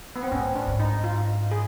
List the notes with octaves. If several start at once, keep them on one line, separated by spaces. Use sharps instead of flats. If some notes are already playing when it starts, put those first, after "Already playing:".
B3
C4
A2 C#4
D4
G#2
D#4
F4
G#4